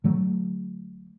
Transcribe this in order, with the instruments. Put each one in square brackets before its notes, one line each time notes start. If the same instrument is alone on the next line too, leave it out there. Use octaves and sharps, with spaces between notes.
[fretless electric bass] D3 F#3 A3